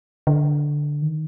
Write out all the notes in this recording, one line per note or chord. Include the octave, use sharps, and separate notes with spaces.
D3
D#3